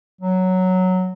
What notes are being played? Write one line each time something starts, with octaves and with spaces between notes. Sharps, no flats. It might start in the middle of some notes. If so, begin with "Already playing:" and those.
F#3